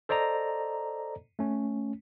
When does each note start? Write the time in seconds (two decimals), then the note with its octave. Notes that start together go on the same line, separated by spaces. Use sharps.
0.09 A4 C5 D5 D#5 A#5
1.39 A3 C#4